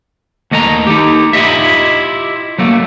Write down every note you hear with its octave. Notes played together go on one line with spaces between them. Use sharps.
D#2 A3 D#5 F5 A#5
D#4 G4
E4 F4 G4 D#5 E5
F#3 A3 A#3